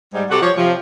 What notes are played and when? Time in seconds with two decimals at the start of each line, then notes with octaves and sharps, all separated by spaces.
0.14 G#2 G3
0.30 C3 F#4 G4 A4 F#5
0.42 F3 C#5
0.57 C3 F3